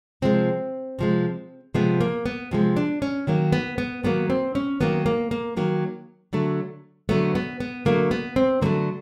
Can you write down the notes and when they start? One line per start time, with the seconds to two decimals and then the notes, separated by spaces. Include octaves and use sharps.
0.22 C3 F3 G#3 C4
0.99 C3 F3 G#3
1.74 C3 F3 G#3 B3
2.01 A#3
2.26 B3
2.51 C3 F3 G#3
2.76 D4
3.02 C#4
3.27 D#3 F#3 A#3
3.52 B3
3.78 B3
4.03 D#3 F#3 A#3 B3
4.30 C4
4.55 C#4
4.80 D#3 F#3 A#3 B3
5.06 A#3
5.31 A#3
5.57 D#3 F#3 A#3
6.33 D3 F#3 A3
7.09 D3 F#3 A3 B3
7.35 B3
7.60 B3
7.85 D3 F#3 A3 A#3
8.11 B3
8.36 C4
8.61 D3 F#3 A3 A#3